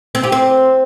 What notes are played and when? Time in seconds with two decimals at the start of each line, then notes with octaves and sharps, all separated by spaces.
0.15 C4
0.23 G4
0.32 C4